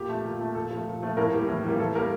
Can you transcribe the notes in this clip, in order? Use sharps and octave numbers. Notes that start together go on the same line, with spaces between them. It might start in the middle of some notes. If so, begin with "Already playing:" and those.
Already playing: A#2 G4
A3
A#2
A3
A#2 A4
F3 A3
A#2
F3 A3
A2 A#3 A#4
E3 G3 A#3
A2
E3 G3 A#3
A2 A4
G3 A#3 A#4